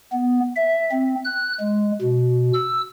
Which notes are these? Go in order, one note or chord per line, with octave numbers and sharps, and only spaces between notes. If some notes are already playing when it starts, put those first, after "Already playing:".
B3
E5
C4
F#6
G#3
B2
E6